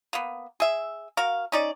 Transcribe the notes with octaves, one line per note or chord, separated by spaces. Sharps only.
A#3 B3
G#4 E5
F#4 A#4 F5
C#4 D#4 D5